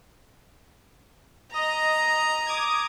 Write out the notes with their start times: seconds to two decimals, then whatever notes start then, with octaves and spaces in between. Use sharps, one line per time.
1.53 D#5 A#5 A#6
2.46 D6 D#6 G#6